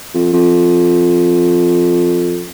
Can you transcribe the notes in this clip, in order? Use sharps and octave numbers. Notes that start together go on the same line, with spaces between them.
F2
F2